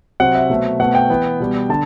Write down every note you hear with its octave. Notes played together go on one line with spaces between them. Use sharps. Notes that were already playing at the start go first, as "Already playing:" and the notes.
C3 F#3 C4 F#5
E5
B2 F#3 A3 C4
B2 A3 C4 F#5
G5
E3 B3
B2 G3 B3
D3 A5